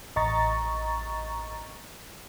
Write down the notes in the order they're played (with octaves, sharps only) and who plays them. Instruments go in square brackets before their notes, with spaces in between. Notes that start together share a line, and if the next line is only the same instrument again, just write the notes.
[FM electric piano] A1 D#5 A#5 C#6 A6